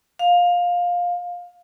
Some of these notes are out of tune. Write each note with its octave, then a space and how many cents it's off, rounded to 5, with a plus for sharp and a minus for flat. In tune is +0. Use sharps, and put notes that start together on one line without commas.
F5 +15